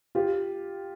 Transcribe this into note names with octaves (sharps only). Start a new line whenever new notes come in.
F4 G4